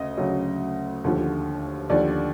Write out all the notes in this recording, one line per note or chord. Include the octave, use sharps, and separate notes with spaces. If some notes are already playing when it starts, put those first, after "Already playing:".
Already playing: D2 C#3 D#5
D2 C#3 F#3
D#2 D3 F3
D#2 D3 F3 D5